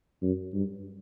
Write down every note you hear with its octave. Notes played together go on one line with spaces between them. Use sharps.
F#2
G2